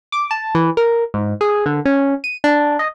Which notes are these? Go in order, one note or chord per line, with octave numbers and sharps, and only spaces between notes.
D6
A5
E3
A#4
G#2
G#4
D3
C#4
D#7
D4
D#5